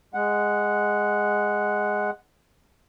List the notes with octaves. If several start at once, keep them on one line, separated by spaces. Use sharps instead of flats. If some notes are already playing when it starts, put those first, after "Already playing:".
G#3 F#5